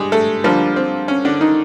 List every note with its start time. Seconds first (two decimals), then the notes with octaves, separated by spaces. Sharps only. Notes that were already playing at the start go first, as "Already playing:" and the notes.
Already playing: G3 G#3 D4 G4 G#4
0.12 A3 A4
0.44 D3 F3 G3 A#3 F4
0.76 C4
1.08 C#4
1.25 D3 D4
1.41 D#3 D#4